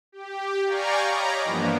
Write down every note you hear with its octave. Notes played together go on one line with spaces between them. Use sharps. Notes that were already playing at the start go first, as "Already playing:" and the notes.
G4
D5 F5 G5 G#5 A#5 C#6
C#5 D#5 A#5 B5 D6
G2 E3 F3 A#3 B3 D4